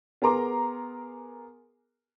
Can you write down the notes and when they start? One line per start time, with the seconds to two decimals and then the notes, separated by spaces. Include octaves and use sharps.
0.22 B3 G#4 A#4 A#5 C6 D6